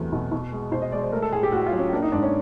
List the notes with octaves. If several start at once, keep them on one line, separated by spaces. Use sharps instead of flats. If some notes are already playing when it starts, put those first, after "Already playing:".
Already playing: E2 C3 F#3 A3
B2
B2
G#3
B2 C5
D#5
G#3 D5
C5
A3 A#4
A4
A2 G#4
G4
A2 F#4
F4
F#3
C#4
A#3 D4
D#4
G#2 D4
C#4